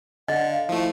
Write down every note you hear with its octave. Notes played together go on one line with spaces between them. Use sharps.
D3 D#5 F#5
F5
F3 A3 E4